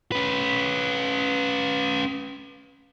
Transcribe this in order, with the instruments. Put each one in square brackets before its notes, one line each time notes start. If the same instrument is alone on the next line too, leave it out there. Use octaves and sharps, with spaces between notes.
[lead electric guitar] C#4 B4